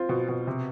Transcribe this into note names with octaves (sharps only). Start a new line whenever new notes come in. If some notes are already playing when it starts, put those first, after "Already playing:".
Already playing: C4 F4
B2
B2
C3